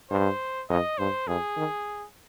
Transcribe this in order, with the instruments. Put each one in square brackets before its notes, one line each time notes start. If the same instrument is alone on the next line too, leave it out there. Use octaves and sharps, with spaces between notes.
[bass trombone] G2 [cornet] C5
[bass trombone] F2 [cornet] D#5
[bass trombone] G2 [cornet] C5
[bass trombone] F2 [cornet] G#4
[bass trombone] D#3